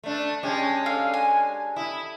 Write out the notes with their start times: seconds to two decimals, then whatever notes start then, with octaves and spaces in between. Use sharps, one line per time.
0.03 A3 D4
0.43 G#3 C#4 G4 G#5 A5
0.86 D4 A4 F5
1.14 G#5
1.76 E4 D#6